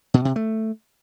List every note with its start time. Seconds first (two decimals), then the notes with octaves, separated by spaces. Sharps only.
0.14 B2
0.25 C3
0.36 A3